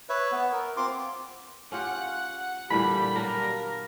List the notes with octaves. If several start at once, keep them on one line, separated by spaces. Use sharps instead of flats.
B4 C#5 E5
B3
A#4
C4 F4 C6 D6
C#4 F4 G4 F#5
A#2 D3 E3 G3 B5
F#3 A#3 D4 A#4